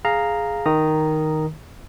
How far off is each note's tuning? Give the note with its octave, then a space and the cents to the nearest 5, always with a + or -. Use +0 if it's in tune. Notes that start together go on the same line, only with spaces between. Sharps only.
G#4 +0 F5 +0 A#5 +0
D#3 +0 A#5 +0 D#6 +0